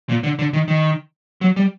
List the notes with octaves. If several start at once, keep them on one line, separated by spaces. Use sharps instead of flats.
A#2
D3
D3
D#3
D#3
F#3
G3